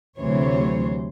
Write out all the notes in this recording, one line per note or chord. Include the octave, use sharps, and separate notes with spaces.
D2 C3 E3 F#3 C5 C#5